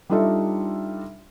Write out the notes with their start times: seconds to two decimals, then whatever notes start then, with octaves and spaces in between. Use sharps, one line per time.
0.09 G3 D4 D#4 F4 A4 E5